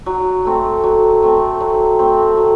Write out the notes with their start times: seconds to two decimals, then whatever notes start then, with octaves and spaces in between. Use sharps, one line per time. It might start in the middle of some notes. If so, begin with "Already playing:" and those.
0.06 F#3
0.45 A3 C4
0.84 F#3
1.23 A3 C4
1.60 F#3
1.99 A3 C4
2.37 F#3